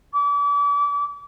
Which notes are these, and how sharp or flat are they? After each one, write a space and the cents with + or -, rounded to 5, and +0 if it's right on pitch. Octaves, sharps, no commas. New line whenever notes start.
D6 -35